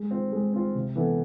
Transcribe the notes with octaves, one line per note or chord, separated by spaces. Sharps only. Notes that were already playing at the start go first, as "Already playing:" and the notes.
Already playing: G#3
C4 F4
G#3
C4 F4
C3
E3 B3 E4 A4